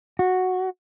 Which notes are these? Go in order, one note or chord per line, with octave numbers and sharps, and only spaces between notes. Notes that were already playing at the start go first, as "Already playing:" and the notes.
F#4